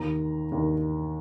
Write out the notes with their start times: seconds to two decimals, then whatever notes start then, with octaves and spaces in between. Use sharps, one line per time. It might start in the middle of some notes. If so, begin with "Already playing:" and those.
Already playing: D#2 D#3 A#5
0.52 D#2 D#3